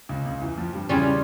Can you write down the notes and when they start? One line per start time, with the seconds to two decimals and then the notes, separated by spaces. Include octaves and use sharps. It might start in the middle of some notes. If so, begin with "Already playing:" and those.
0.09 C#2 C#3
0.26 C#2 C#3
0.42 E2 E3
0.57 F2 F3
0.73 G2 G3
0.89 E2 C#3 E3 G3 C#4 F4